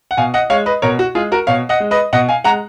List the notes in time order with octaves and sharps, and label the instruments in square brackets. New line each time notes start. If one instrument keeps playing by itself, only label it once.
[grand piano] F#5
B2 F5 G#5
D#5 F#5
G#3 C#5 F5
B4 D#5
B2 A#4 C#5
F#4
G#3 F4 G#4
F#4 A#4
B2 C#5 F5
D#5 F#5
G#3
B4 D#5
B2 D#5 F#5
F5 G#5
G#3 F#5 A#5